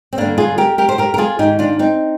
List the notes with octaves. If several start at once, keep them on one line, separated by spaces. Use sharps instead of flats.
C4
G2 D3 A#3 D4
F4 G#4
G4 A#4
G4 A#4
C5
G4 A#4
A#4
F4 G#4
G#2 D#3 D#4 G4
D4 F4
C4 D#4